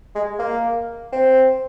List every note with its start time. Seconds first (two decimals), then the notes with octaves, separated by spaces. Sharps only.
0.15 G#3
0.39 A#3
1.12 C4